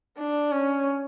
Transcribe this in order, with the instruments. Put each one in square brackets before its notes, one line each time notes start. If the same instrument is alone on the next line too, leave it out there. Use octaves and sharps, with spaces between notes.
[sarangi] D4
C#4